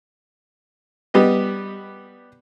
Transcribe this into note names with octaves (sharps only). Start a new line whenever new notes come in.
G3 B3 G4 D#5